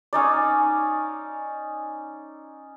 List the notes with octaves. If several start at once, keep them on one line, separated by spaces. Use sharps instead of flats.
C#4 D#4 D5